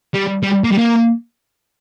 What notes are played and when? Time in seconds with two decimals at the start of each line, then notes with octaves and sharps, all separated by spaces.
0.15 G3
0.43 G3
0.64 A#3
0.72 G3
0.78 A#3